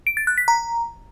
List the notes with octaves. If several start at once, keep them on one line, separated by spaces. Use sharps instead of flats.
D7
A6
F#6
B6
A#5